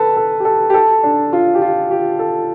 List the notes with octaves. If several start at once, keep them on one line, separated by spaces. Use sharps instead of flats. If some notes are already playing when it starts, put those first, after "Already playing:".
Already playing: A4 B4
A4
G4
A4
G4
A4
D4
F4
G4
F4
G4
A4